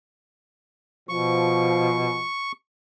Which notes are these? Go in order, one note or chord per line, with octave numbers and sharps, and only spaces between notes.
B2 F3 C#6